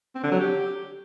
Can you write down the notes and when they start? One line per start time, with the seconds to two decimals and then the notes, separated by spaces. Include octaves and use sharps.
0.15 C4
0.23 D3
0.32 F#3
0.40 G4